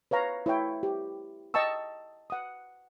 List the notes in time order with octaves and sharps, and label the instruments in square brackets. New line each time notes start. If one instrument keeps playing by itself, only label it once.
[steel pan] B4 C#5 F5 A#5
E4 C#5 G5
G4
D#5 G5 A5 C#6 E6
F#5 D#6